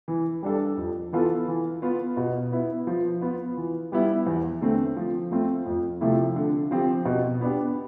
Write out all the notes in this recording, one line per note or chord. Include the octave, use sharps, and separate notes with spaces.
E3
G3 D4 A4
F2
E3 B3 F4 A4
E3
B3 F4
B2
B3 E4
F3
B3 F4
E3
G3 B3 E4
E2
D3 A3 C4
F3
A3 C4 F4
F2
C3 F3 A3 E4
D3
F3 C4 G4
B2
B3 D4 G4